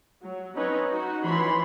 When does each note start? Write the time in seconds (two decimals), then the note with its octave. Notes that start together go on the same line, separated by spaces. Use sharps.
0.20 F#3
0.55 C4 C#4 D#4 B4 C#5
0.90 D#4 F#4
1.25 E3 F3 C#5 B5 C6